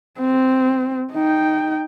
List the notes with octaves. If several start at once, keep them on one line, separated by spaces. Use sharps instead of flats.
C4
D#4 G5